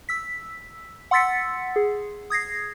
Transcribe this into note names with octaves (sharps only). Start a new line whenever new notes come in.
E6 B6
F#5 C6 E6 A6 B6 C#7
G#4
D#6 G#6 A#6 C7